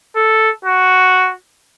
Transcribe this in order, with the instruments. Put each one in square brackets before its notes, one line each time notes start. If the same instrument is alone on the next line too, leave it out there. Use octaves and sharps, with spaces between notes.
[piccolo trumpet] A4
F#4